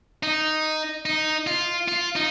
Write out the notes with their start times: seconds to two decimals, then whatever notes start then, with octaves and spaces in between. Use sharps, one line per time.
0.23 D#4
1.06 D#4
1.47 F4
1.88 F4
2.16 D#4